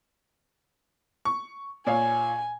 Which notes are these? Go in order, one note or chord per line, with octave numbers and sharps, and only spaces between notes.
C#6
A#2 C#5 F5 G#5